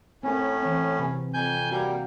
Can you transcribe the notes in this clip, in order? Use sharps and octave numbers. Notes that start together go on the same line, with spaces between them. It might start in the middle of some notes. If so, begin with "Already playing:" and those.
A2 C4 C#4 A#4
E3 C4
C3 C4 B4
F2 G#5 G6
G3 A#3 F#4